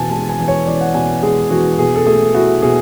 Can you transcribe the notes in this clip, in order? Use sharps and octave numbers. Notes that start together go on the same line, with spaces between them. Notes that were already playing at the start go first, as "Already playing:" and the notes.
Already playing: E2 B2 G#5 A5
G#3 A5
G#5
E2
C#5
E2 D5
F#5
B2 G#5
G#3 G#4
E2 F#4
B2 G#4
A4
A3 G#4
E4 F#4
B2 G#4